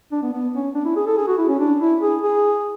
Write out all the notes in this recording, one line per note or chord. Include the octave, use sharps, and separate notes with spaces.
D4
B3
B3
C#4
D4
E4
G#4
A4
G#4
F#4
E4
C#4
D4
E4
G#4
G#4